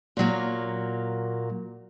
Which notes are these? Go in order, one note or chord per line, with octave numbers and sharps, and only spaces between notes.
A#2 F#3 A#3